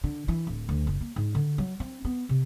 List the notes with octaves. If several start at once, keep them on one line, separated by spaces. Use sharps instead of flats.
D3
E3
D1
D2
F#1
A#3
G#2
D3
F#3
C4
B3
C3